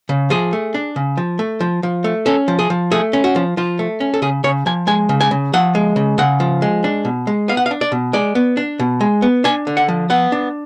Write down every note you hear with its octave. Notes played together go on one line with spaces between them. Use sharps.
C#3
F3 G#4
A3
D4
C#3
F3
A3
F3
F3
A3
C#4 A4
F3
G#4
F3
A3 G#4
C#4
F#4
F3
F3 F4
A3
C#4
A4
C#3 G#4
C#3 C#5
F3 G#5
G#3 G#5
C#3
G#5
C#3
F3 F#5
G#3
C#3
C#3 F#5
F3
G#3
D4
B2
G#3
B3 F5
F#5
F5
D4
D5
B2
G#3 D5
B3
D4
B2
G#3
B3
D4 G#5
D3
F#5
F3
B3 F#5
D4